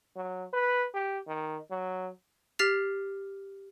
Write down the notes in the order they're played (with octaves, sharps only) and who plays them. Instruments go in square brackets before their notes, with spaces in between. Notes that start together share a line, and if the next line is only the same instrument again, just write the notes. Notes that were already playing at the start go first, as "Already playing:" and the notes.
[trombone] F#3
B4
G4
D#3
F#3
[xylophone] G4 F6 A6 B6 C7 F7